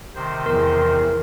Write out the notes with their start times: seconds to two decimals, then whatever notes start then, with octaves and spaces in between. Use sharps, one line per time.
0.15 C3 D#3 C5
0.46 E2 A#4